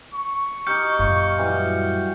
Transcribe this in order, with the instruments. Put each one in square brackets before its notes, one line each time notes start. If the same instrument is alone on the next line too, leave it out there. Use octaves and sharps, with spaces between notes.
[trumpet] C#6
[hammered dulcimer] D#4 G4 [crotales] F6 G6 C#7
[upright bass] F#2 A#2 [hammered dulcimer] F4
[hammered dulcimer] E3 F#3 G3